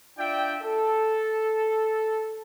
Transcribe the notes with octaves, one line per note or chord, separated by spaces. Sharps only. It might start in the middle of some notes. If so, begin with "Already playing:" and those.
D4 F4 D5 E5 G5
A4